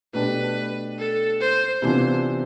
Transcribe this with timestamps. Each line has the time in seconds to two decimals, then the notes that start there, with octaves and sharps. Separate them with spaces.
0.14 B2 A3 D4 G4 B4
0.98 A4
1.40 C5
1.82 C3 E3 B3 D4 F4 C5